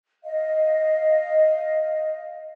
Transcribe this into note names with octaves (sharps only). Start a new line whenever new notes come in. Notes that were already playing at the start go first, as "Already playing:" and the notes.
D#5 F5